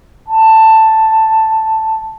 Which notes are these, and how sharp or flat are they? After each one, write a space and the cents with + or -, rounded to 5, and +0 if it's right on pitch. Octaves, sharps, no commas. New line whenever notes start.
A5 +5